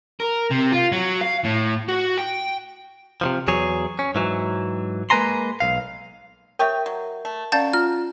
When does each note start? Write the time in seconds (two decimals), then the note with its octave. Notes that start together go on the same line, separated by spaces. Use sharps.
0.20 A#4
0.51 C3
0.72 F4
0.92 F#3
1.21 F5
1.44 A2
1.89 F#4
2.18 G5
3.21 C3 D#3 F3
3.48 E2 F#3 G#4 C#5
3.99 C#4
4.15 G#2 E3 F#3
5.10 G#3 A#3 B4 G#5 A#5 C6
5.60 B1 F5
6.59 G4 A#4 C#5 E5 G5
6.86 F#3
7.25 A3
7.52 F#3 C#4 D5 F5 A5 G6 A6
7.73 F4 F6